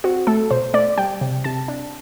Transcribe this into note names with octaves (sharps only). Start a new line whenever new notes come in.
C4 F#4
A3 A4
B2 C5
A3 D5
G3 G5
C3
C3 A5
D4